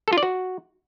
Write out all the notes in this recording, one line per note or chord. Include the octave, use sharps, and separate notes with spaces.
A4
F4
D5
F#4